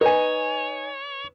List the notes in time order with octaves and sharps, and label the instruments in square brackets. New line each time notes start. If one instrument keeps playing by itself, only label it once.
[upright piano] D#4 G#5 [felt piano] B4 [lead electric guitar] C#5